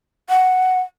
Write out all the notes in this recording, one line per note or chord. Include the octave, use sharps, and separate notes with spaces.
F#5